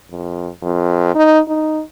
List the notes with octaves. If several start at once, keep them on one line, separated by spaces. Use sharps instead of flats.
F2
F2
D#4
D#4